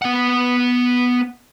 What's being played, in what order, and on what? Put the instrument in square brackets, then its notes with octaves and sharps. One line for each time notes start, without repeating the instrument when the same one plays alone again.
[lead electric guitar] B3 F#5